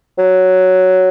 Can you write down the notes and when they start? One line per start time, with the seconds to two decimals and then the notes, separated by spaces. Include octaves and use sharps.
0.18 F#3